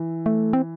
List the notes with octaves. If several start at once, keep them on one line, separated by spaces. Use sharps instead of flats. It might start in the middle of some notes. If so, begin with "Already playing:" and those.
Already playing: E3
A3
C4